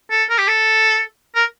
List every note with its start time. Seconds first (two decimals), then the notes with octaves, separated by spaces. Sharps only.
0.11 A4
0.30 A#4
0.38 G4
0.48 A4
1.35 A#4